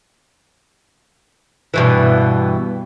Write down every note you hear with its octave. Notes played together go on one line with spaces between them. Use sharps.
G2 B2 E3